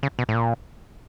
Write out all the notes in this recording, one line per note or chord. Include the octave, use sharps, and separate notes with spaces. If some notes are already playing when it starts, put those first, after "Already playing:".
C#3
B2
A2
A#2